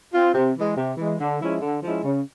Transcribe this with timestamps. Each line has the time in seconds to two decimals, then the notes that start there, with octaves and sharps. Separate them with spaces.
0.13 C4 F4
0.34 C3
0.55 E3 G#3
0.76 C3
0.98 E3 G#3
1.19 D3
1.40 F3 G#3 C#4 E4
1.61 D3
1.82 F3 G#3 C#4 E4
2.04 C#3